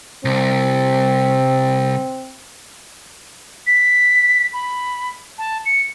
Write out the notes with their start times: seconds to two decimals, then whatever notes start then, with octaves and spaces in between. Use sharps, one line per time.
0.25 C2 C4
3.67 B6
4.53 B5
5.38 A5
5.66 C#7